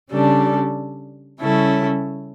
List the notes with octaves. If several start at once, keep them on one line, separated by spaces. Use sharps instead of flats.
C#3 G3 D4 A4
C#3 G3 C#4 E4 A4